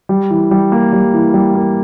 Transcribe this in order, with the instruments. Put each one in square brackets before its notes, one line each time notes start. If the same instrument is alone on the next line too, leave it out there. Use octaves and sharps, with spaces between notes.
[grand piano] G3
E3
G3
A#3
G3
E3
G3
A#3